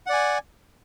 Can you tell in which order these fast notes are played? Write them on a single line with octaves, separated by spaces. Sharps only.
F#5 D5 G#5